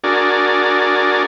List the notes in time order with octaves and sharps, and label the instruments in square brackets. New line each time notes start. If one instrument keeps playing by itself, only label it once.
[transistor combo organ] D4 F#4 G#4 A#4 D5